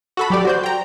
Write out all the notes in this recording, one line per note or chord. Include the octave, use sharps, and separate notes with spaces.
F#4 A4 B5
F#3 G4 D5
F#4 C5 G6
G5 A#5